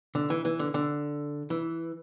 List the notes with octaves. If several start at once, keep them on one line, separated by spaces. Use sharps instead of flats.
D3
E3
E3
D3
D3
E3